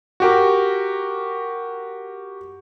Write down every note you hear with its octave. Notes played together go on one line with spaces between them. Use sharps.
F#4 G4 A#4